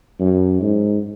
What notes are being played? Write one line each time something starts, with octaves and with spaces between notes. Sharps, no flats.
F#2
G#2